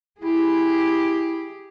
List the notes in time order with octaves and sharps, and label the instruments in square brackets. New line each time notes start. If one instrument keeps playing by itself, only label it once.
[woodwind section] E4 [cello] G4 G#4